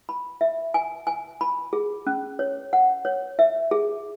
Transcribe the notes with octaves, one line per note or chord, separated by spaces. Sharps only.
B5
E5
G#5
G#5
B5
G#4
C#4
C#5
F#5
C#5
E5
G#4